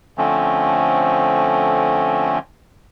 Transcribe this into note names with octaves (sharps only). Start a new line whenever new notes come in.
D3 F3 A3 C4 C#4